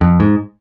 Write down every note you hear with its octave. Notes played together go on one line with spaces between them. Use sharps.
F2
G#2